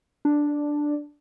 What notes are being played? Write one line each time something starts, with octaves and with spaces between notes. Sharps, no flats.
D4